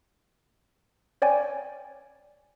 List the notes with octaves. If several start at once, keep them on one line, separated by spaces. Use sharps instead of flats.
C#5 D5 G5 G#5